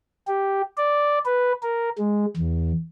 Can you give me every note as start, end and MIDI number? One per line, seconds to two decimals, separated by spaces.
0.27 0.62 67
0.77 1.19 74
1.25 1.52 71
1.62 1.89 70
1.98 2.26 56
2.37 2.72 40